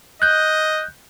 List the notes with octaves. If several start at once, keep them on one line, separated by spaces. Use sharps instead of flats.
D#5 F#6 G6